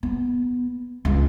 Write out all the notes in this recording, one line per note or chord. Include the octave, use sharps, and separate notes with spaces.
B3
C#2